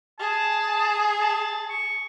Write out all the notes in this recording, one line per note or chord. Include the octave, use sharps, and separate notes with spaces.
G#4 A5
A5
C#6